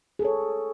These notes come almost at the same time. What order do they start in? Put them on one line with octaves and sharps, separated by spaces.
G#4 A4 C#5